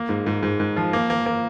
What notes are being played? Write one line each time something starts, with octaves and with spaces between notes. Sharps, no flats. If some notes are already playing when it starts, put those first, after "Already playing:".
Already playing: A#3
G#2
G#2
G#2
G#2
F3
A#3
A#3
A#3